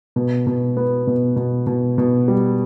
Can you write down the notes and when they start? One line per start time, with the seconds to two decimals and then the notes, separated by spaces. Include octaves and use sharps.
0.16 B2
0.47 B2
0.77 B3
1.07 B2
1.36 B2
1.67 B2
1.98 B2
2.28 G3